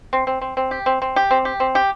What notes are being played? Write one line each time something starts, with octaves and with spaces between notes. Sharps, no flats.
C4
C4
C4
C4
G4
C4
C4
G4
C4
G4
C4
G4